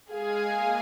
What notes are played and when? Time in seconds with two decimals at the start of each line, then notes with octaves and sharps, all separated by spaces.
0.11 G#3 G#4 F5 G#5
0.48 A#3